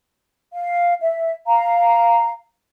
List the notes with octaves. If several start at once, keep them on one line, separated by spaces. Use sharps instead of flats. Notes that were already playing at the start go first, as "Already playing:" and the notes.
F5
E5
F5 A#5